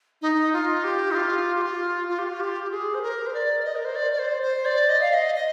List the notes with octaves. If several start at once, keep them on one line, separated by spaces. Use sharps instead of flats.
D#4
F4
G4
D#4
F4
G4
F4
F4
G4
F4
G4
G4
G#4
C5
A#4
C5
D5
D5
D#5
A#4
C5
D5
D5
C5
C5
D5
D#5
F5
D#5
D#5